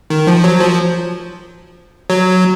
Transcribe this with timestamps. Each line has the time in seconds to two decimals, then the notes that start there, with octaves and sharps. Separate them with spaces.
0.10 D#3
0.27 F3
0.44 F#3
0.60 F3
2.10 F#3